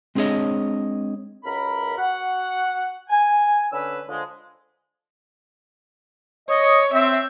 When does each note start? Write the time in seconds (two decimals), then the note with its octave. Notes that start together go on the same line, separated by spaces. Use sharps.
0.15 G#3 C4 D4 G#4 C#5 D#5
1.44 C#2 F#2 A#4 B5
1.96 F#4 F#5
3.09 G#5
3.71 D3 C#4 B4 E6
4.09 D3 F3 G#3
6.49 C#5 D#5
6.93 C4 E5